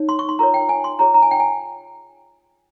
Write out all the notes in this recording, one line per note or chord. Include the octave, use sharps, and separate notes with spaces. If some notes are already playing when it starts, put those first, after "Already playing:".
Already playing: D#4 C#5
C6
C#6
C6
F4 A#4 C#5 A#5
G5
G#5
C6
F4 G#4 C#5 A#5
A#5
G#5
G5
G#5